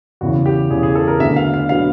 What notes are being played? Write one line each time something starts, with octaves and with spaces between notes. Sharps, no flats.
E2 C#3 E3 F#4
G4
E2 C#3 E3 G#4
G#4
A4
A#4
D2 D3 F#3 B3 E5
F5
F5
D3 F#3 B3 F5